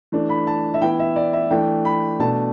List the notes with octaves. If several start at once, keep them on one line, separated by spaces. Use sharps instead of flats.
E3 A3 D4
B5
A5
E5
E3 B3 E4 G5
E5
D5
E5
E3 A3 D4 G5
B5
B2 A3 D4 A5